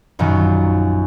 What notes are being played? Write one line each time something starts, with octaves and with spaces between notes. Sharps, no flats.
A#1 F#2 B2 D#3